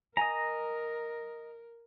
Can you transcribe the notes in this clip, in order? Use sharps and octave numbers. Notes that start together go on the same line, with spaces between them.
A#4 D#5 G#5 A#5